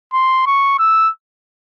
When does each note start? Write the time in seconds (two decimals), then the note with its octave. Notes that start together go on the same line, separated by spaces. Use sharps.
0.13 C6
0.47 C#6
0.79 E6